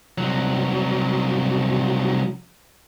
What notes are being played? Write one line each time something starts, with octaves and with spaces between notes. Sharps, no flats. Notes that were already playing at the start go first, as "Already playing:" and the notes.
C2 F#3